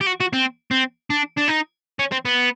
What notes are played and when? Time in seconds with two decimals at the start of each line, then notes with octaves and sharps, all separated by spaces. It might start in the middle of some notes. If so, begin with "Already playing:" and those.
0.01 G4
0.06 F#4
0.20 F#4
0.33 C4
0.71 C4
1.10 D4
1.38 D4
1.49 D#4
1.99 C#4
2.12 C4
2.25 B3